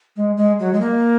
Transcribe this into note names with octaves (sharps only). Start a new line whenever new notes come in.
G#3
G#3
F#3
G#3
A#3